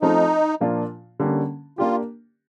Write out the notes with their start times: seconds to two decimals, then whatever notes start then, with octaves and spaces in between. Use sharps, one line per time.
0.02 F3 A3 C4 D#4
0.60 A#2 F3 A#3 D4 F4
1.20 D3 G3 A#3 C#4
1.78 A#3 D4 F4 G4